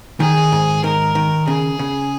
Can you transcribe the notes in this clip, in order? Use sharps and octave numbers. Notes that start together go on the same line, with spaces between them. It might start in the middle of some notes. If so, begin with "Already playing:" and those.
D#3 G#4
G#2
D#3 A#4
D#3
C#3 G#4
C#3